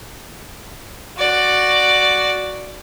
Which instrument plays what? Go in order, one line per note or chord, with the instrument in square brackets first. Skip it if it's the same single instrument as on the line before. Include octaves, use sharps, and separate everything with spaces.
[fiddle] F#4 D5